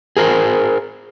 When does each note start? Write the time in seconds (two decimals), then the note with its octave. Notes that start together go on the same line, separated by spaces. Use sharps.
0.17 G#4 A#4 C5